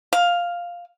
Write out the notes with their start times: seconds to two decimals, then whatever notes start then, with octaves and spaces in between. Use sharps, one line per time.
0.13 F5